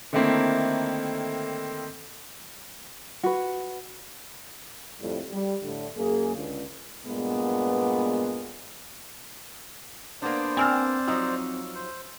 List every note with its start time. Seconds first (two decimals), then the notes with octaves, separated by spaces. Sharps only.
0.13 D3 D#3 A3 A#3 C4 E4
3.23 F#4 B4
5.00 F2 A2 G3
5.31 G3
5.63 A2 D3
5.96 F#2 A#3 G#4
6.36 C#2 D3
7.06 G2 A#2 G#3 B3
10.22 A#3 B3 D4 C5 D5
10.57 C4 G#5 E6 F6
11.08 F3 F#3 D#4 E6
11.75 C5